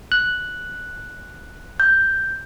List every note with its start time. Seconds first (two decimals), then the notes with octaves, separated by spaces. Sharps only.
0.12 F#6
1.80 G6